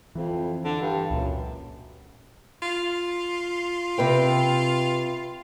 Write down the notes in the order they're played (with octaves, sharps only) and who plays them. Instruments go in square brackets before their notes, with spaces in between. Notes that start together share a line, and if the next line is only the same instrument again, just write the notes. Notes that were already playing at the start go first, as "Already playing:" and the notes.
[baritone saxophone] F2 [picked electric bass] E3
[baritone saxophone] D3
G2
[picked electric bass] C#2 A#2 [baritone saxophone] F#2
[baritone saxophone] F4
[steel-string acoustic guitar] C3 B4 G5